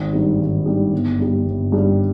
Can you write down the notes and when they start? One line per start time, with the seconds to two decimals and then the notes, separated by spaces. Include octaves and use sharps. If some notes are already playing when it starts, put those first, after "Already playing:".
Already playing: G#1
0.13 G2 D#3 G3
0.39 G#1
0.66 G2 D#3 G3
0.92 G1
1.19 G2 G3
1.46 G1
1.72 G2 G3